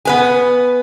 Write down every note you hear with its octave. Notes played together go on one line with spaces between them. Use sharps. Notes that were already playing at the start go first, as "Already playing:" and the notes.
B3 B4 G#5